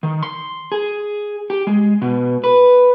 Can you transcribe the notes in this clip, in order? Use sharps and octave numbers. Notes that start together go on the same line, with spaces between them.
D#3
C6
G#4
G4
G#3
B2
B4